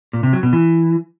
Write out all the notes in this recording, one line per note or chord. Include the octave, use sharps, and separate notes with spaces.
A#2
C3
F#3
B2
E3